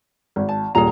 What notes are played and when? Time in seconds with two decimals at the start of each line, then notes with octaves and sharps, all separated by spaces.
0.36 G#1
0.49 A5
0.75 D#1 A#2 G#4 A#5